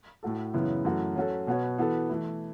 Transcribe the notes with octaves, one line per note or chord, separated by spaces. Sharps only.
A2 A3 F#4 A4
F#2 C#3 E3 B3 E4
F#2 E3 A3 F#4
F#3 C#4 F#4 A4
B2 B3 F#4 C#5
E3 B3 F#4 A4
E3 A3 E4